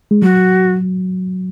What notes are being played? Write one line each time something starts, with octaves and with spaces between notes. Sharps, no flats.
G#3
F#3 F#4